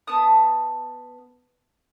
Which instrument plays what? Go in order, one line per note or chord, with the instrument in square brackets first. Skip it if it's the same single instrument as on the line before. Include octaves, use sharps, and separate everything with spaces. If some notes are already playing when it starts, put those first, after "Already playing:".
[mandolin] B3 A5 D#6